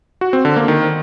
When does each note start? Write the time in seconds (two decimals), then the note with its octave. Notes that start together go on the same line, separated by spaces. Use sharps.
0.21 F#4
0.33 C4
0.45 D3
0.56 A#3
0.68 D#3